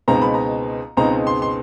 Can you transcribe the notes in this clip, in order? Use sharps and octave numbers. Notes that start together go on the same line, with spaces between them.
C#2 B2 G#3 C4 D#4 A#5
B5
A#5
C#2 B2 G#3 C4 D#4 A#5
C6
C6